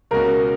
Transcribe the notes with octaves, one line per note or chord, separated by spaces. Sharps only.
C#2 B2 G#3 C#4 F#4 A#4